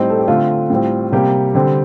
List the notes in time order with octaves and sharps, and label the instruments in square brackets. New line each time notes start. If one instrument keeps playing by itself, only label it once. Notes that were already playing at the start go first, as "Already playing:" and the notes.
Already playing: [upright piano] A2 G3 C4 D#4
A4
G4
D3 A3 C4 F4
A2 G3 C4
C3 G3 A#3 G4
D3 G3 C4